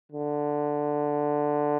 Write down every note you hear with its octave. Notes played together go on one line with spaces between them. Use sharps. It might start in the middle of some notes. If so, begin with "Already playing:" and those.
D3